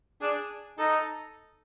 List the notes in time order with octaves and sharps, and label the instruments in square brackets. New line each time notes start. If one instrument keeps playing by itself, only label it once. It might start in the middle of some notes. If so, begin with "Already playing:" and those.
[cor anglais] D4 [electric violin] G#4
[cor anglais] D#4 [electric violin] A4